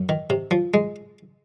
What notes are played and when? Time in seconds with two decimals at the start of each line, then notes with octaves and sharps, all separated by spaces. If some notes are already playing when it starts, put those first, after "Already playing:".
Already playing: F#2
0.09 D#3
0.30 C3
0.51 F3
0.74 G#3